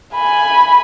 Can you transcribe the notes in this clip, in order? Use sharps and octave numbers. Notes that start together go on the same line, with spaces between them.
G#5 B5